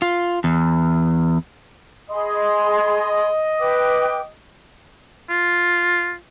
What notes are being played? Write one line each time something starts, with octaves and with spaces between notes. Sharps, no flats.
F4
E2
G#4 D#5 B5 C6
B4 G5 D6
F4